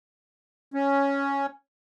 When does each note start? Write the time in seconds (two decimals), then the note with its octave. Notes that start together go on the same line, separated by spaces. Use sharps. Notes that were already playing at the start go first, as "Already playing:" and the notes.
0.74 C#4